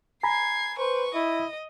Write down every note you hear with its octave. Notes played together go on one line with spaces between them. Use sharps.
G#5 A#5 B5 G#6 C7
B4 C5 C#6
E4 D#5